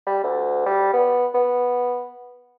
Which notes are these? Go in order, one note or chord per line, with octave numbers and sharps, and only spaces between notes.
G3
D2
G3
B3
B3